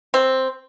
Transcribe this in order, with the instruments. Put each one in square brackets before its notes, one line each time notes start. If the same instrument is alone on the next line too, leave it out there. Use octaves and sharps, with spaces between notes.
[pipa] C4